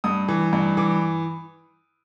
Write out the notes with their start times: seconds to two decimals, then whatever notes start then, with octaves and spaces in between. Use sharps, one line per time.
0.04 G2 D#6
0.28 E3
0.53 G2
0.77 E3 D6